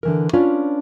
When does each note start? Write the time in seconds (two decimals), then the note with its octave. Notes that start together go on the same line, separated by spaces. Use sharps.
0.03 D3 E3 A#4
0.33 C#4 D4 F4 B4 C#5 D5